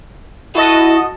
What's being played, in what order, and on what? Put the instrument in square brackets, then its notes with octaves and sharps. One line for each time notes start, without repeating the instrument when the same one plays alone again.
[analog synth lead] E4 [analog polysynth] F#4 D#5 [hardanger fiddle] A4